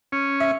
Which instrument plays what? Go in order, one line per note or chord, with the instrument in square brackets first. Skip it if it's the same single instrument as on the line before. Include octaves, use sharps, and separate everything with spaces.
[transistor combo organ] C#4
[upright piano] E5